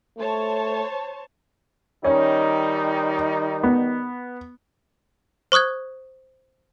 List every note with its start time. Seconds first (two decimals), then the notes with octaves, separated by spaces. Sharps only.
0.18 A3 C5 C#5 A5
2.04 D#3 G3 C#4 D#4
3.63 B3
5.52 C5 C#6 D#6 F#6 G#6